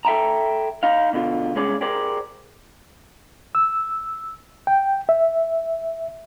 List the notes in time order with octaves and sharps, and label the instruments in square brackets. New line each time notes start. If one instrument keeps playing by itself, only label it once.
[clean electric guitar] A4 E5 G5 A5 A#5
D#4 F5
B2 D3 F4
C2 C3 G#3 C#4 G#4 D5
G4 G#4 A#4 C5 D5
[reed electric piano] E6
G5
E5